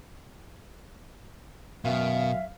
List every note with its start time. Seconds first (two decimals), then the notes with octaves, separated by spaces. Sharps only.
1.85 F#2 B2 D#3 E5 F5